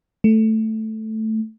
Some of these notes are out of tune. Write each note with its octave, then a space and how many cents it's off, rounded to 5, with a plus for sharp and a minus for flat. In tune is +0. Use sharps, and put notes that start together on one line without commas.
A3 +0